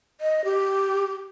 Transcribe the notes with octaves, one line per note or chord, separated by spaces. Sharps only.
D#5
G4